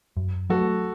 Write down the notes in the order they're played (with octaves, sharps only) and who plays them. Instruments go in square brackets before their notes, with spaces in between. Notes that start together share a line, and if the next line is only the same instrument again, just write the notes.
[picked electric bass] F#2
[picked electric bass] F#3 A3 [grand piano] F#4 A4